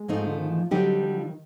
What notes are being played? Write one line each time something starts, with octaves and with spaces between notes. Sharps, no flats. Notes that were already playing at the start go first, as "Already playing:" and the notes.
Already playing: G#3
G#2 F3 A3 C4 D#4
D3
D#3
E3
F3
D3 F#3 G3 C4 D#4 G4
F3
F#3
F3
D#3